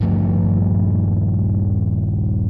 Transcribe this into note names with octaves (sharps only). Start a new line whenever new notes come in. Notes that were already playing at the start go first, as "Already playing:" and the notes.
D#1 G2 F3 A3